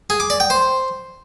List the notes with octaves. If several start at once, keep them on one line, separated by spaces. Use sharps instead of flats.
G#4
D6
D5
G5
C5